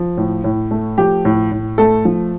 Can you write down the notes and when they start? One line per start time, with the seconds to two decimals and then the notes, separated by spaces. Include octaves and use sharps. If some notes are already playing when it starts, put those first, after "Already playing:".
Already playing: F3
0.17 A2
0.44 A2
0.71 A3
0.98 F3 G4
1.25 A2
1.52 A2
1.78 A3 A4
2.05 F3